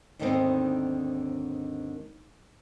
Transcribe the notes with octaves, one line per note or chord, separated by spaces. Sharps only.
D#2 G#2 D3 D#3 B3 C4